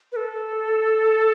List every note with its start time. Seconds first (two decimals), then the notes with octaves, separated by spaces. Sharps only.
0.12 B4
0.16 A4